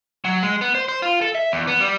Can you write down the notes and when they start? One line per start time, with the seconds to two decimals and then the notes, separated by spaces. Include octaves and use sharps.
0.25 F#3
0.43 G#3
0.61 B3
0.75 C5
0.89 C5
1.02 F4
1.21 A4
1.35 E5
1.52 E2
1.67 B3
1.80 G3